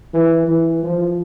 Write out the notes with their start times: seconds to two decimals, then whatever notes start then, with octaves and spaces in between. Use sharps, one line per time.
0.13 E3
0.48 E3
0.83 F3